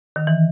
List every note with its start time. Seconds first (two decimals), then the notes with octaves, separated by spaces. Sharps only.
0.16 D#3
0.27 E3